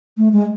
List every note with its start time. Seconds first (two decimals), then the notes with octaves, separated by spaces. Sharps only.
0.17 A3
0.32 G#3